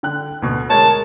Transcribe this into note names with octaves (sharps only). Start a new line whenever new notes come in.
D3 G5 F#6
D2 B2
G#3 A#4 C#5 A5